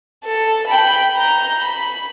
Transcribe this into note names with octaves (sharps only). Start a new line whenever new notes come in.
A4
G5 B5
A#5 G6
B5